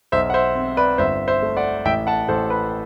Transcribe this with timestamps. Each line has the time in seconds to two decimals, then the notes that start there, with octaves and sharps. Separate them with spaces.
0.12 B1 C5 E5
0.30 F#5
0.34 C5 E5
0.55 C4
0.77 B4 D5
0.98 G1 C5 E5
1.28 C5 E5
1.42 A3
1.57 D5 F#5
1.85 A1 E5 G5
2.07 F#5 A5
2.29 A1 A4 C5
2.50 B4